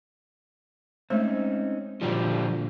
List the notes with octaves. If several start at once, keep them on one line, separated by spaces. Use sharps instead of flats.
G#3 A3 C4 C#4 D#4 C5
A#2 D3 F3 G3